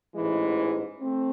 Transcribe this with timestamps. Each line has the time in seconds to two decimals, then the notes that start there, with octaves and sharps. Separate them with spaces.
0.15 A1 G#2 E3 G#3
1.01 A3 C4